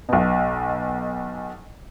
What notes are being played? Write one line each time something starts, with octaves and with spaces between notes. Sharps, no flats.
B1 B2